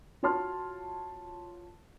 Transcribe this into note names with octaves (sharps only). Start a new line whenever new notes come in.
F4 F#4 C#5 A5 C6 F6